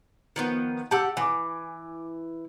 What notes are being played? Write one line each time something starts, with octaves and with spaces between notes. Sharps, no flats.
D#3 F3 B3
G4 F#5 A5 E6
E3 G#5 D6